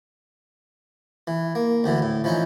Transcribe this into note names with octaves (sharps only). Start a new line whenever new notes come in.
E3
A#3
D2 D3 E3
A2
E3 F3 C#4 D#4